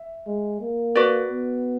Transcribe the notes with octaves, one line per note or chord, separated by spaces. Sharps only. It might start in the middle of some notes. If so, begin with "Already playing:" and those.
Already playing: E5
G#3
A#3
F#4 B4 D5
B3